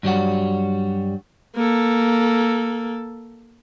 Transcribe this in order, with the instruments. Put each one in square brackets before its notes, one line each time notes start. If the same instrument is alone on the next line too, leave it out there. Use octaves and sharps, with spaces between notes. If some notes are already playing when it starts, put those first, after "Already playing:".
[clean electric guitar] G2 F#3 G3 F#4
[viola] A#3 A4